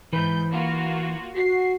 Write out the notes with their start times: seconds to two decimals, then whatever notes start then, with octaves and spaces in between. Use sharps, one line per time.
0.13 G#2 E3 B4 G6
0.51 A#3 F4 F#4
1.35 F#4 C7